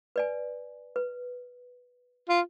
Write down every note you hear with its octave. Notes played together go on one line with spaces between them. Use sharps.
B4 D5 G#5
B4
F4